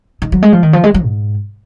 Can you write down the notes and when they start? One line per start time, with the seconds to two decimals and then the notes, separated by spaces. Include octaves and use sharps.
0.22 D#3
0.32 F#3
0.42 G#3
0.53 F3
0.63 D#3
0.73 F3
0.84 G#3
0.94 F#3
1.05 G#2